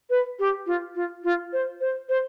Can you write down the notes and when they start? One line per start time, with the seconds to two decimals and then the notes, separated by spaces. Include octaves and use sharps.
0.10 B4
0.39 G4
0.66 F4
0.95 F4
1.24 F4
1.53 C5
1.80 C5
2.09 C5